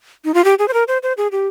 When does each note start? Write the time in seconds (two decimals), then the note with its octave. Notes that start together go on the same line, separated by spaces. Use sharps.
0.25 D#4
0.34 F4
0.44 G4
0.59 G#4
0.68 C5
0.74 A#4
0.88 C5
1.03 C5
1.17 G#4
1.32 G4